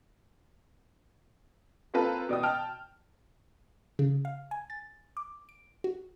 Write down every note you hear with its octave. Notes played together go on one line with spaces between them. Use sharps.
A#3 C4 F4 A4 B4
B2 D5 G5 D#6
G5 A5 F6
C#3
F5
G#5
A6
D6
D7
F#4